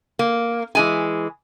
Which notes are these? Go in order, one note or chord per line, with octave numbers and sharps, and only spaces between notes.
A#3
E3 G#3 G#5